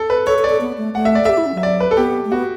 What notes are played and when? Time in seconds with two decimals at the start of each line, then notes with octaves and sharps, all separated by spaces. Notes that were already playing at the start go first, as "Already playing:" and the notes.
Already playing: A4
0.10 B4
0.27 A4 C#5
0.39 A4
0.44 D5
0.49 A4
0.61 B3
0.78 A3
0.95 A3 F#5
1.05 E5
1.15 D5
1.25 G4 A4 E5
1.38 E4
1.46 C#4
1.55 F#3 E5
1.63 D5
1.80 B4
1.91 A4
1.97 B3 G4
2.25 A3
2.31 B3 F#4